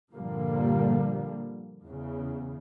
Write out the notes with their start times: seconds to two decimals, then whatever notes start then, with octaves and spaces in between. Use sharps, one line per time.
0.12 G2 A#2 D3 F3 G3 A#3
1.85 E2 C#3